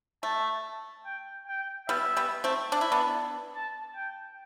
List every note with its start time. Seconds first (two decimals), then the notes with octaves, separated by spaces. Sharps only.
0.23 A3 A5
1.05 G5
1.48 G5
1.89 G3 B3 E5
2.17 G3 B3
2.44 A3 C4
2.72 D4
2.81 E4
2.92 B3 D4
3.55 A5
3.96 G5